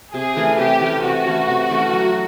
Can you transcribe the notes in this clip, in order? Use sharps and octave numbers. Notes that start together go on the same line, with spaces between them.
C3 G#4
E3 A3 C#4
C3 G4
E3 A3 C#4
C3 F#4
E3 A3 C#4
C3
E3 A3 C#4
F#3